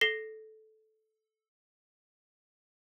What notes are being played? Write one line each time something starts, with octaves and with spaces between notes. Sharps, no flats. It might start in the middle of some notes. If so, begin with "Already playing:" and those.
A4 A#6 C7 G7